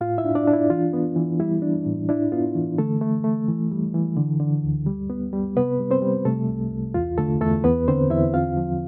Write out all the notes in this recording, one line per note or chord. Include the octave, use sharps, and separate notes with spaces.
A2 F4 F5
E4 E5
D4
D4 D5
D4
E4
E3 F4
B3
E3
G3 E4
D4
A2
D4 E4
B3 F4
E3
D3 A3 A4
A3
A3
E3
G3
E3
D3
D3
D2
G3
B3
G3
C3 B3 B4
G3
C4 C5
G3
C3 A3 A4
C2
C2
E2 F4
D3 A3 A4
E2 A3 A4
E2 B3 B4
D3 C4 C5
E2 E4 E5
C4 F4 F5
F3